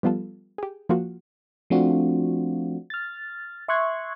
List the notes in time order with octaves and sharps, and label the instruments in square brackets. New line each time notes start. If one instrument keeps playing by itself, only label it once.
[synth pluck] F3 G3 B3 F4 A4
G4 G#4
F3 A#3 F4 F#4
[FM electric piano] F3 A3 C4 D4 F4 F#4
F6 A6
E5 C6 C#6 F#6 G#6